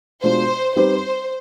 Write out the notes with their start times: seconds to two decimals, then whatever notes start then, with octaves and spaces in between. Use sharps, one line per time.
0.22 B2 G#3 D4 F4 C5
0.76 G3 C4 D#4 G4 B4 C5